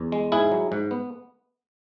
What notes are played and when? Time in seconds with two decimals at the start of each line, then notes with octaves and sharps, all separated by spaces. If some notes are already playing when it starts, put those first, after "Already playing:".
Already playing: E2
0.12 G#3
0.32 G#2 E4 G#4
0.52 F#3
0.72 G#2
0.91 B3